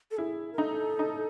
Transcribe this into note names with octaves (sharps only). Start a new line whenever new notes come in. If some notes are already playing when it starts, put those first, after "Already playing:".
A4
E4 G#4
A#4
D#4 A4
D#4